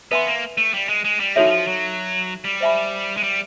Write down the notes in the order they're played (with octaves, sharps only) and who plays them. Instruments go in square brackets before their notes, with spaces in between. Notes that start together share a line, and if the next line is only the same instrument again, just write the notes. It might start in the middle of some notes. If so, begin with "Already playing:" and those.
[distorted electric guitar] B3 [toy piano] B4 E5 G#5 C6
[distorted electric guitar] A#3
A3
G3
G#3
G#3
G3
[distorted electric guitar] D#3 [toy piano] D#4 F#4 A4 C#5 E5
[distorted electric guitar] E3
F3
F#3
G3
[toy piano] C5 E5 G#5 B5
[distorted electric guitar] G#3
G3